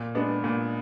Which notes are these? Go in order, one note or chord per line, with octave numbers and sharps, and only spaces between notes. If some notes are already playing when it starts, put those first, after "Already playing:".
Already playing: A#2
G#3 B3 D4
A#2